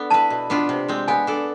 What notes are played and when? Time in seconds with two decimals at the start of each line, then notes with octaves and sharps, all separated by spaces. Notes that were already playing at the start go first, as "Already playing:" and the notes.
Already playing: B3 D4 A4
0.10 E4 B4 A5
0.30 B2
0.50 B3 D4 F4
0.69 C3
0.88 G#3 C4
1.08 B3 G#5
1.27 D4 A4 D5